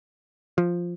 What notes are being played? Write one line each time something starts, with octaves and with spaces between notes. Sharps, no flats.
F3